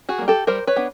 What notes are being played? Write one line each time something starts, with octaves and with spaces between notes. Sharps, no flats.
F#4 G#4
G3 A#3
G4 A4
G3 A#4 C5
B4 C#5
B3 D4